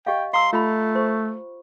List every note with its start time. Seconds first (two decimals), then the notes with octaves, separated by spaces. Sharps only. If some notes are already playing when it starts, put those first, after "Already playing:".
0.07 G4 D#5 F5 G5
0.33 F5 A#5 C6 E6
0.53 A3 F4 B5
0.95 C5 C#6